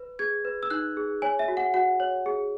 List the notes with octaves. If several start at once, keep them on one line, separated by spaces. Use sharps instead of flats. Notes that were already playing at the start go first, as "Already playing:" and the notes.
Already playing: B4
G#4 G#6
B4
E6
D#4 F#6
G#4
C#5 G#5
E5
F#4
F#5
F#4 F#5
C#5
G#4